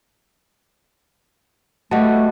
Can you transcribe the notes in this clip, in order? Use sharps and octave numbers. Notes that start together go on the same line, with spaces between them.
G3 A3 B3 F#4 D#5 A5